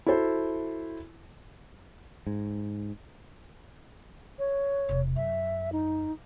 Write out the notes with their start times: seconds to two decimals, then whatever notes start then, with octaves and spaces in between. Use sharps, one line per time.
0.06 E4 F#4 A4 C5
2.27 G#2
4.39 C#5
4.89 E1 C3
5.16 F#2 E5
5.72 D#4